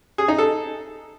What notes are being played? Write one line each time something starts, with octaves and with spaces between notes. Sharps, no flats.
G#4
D#4
A4